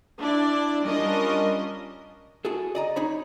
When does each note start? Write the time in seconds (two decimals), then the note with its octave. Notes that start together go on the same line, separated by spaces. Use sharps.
0.19 D4 E4 D5
0.85 G3 C#4 D4 F4 A#4 D#5
2.45 E4 F#4 G#4 A4
2.75 D5 D#5 A#5
2.96 D#4 G#4 C#5 B5